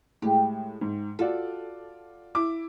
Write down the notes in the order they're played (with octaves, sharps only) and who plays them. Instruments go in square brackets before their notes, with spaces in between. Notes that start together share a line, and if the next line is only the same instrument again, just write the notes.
[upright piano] A2 G#3 [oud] G4
[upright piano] G#2
[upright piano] F4 F#4 D5 [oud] A4
[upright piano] E4 D6